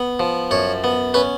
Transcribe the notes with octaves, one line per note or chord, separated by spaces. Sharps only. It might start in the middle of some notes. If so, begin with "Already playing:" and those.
Already playing: B3
F3
F#2 C#5
B3
C#4 B4